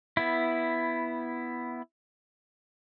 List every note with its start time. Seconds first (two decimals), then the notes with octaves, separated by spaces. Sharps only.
0.17 B3 E4